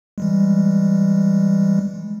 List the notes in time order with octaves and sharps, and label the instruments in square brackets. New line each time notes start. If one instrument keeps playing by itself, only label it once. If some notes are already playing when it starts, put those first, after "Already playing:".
[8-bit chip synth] E3 G3 G#3